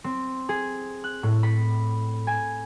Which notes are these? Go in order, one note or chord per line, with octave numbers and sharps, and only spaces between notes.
C4
G#4
F#6
A2
B5
G#5